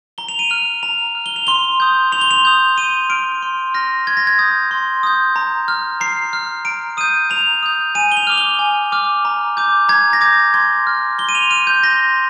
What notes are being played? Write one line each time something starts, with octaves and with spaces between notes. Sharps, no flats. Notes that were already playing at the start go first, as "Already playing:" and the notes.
A#5 G7
F7
D#7
F6 F7
A#5 F7
F6
G7
F7
C6 G7
D#6 G6
C6 F7
G7
F7
D#6 G6
C6 D#7
F6 D7
C6
F6 A#6
C6 G#6
A#6
G#6
D#6 G6 G#6
C6
D#6 G6
A#5
F6
A#5 C7
F6
A#5 D7
D#6 G6 D#7
A#5 F7
D#6 G6
G#5 D#7
G7
F7
D6 F6 F7
G7
G#5
D6 F6
A#5
D6 G6
A#5 G#6
A#6
D6 G6 G#6
C6 G#6
F6
C6 G7
D#7
F7
F6 D#7
G6
C6 A#6